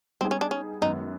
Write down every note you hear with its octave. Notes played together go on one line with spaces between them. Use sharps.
G3 B3 C4 D#4 G#4
C#4
D4
C#4
F#2 D#3 G#3 B3 D#4